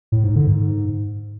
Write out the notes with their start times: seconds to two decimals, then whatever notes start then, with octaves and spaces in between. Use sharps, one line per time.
0.12 A2
0.24 G#2
0.36 D3
0.47 G#2